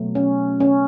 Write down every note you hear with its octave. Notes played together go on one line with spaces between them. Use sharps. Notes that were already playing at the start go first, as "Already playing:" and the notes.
Already playing: B2 F#3 A3
C#4
C#4